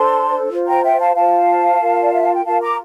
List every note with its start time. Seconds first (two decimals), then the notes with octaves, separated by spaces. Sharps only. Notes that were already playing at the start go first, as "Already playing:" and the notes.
Already playing: D4 A4 C5 A5 C6
0.51 F4 C5
0.67 G5 A#5
0.84 E5 G5
1.00 F5 A5
1.15 F4 C5 F5 A5
1.81 F4 A#4
2.01 D5
2.12 E5
2.23 F5
2.35 G5
2.46 F4 A#4 F5 A5
2.62 A#5 D6